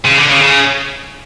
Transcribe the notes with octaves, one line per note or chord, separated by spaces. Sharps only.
C#3
D3
C#3
C#3